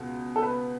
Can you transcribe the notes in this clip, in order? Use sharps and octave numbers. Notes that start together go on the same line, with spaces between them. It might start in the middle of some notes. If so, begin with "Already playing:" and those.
Already playing: C#2 B2
A4
B4